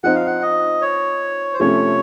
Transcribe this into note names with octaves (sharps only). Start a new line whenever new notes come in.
F3 C4 D#4 F#5
F5
F#5
D#5
C#5
C5
C3 F3 A3 C#4 C#5